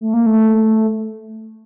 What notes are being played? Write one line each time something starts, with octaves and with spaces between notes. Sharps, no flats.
A3
A#3
A3